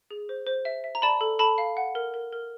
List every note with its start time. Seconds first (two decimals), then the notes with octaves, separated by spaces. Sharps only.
0.11 G#4
0.29 C5
0.47 C5
0.65 E5
0.84 E5
0.95 A#5
1.02 D5 A5 B5
1.21 A4
1.39 A4 A5 B5
1.58 F5
1.77 F#5
1.95 A#4
2.14 A#4
2.33 A#4